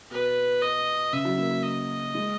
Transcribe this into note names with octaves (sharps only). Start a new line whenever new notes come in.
B2 B4
D#5
C#3 E5
F#3
A#3
A#3
D#5
G#3